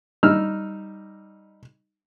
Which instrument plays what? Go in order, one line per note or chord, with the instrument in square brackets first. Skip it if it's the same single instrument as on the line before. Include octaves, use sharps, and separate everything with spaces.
[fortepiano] G3 D#4 E6 F6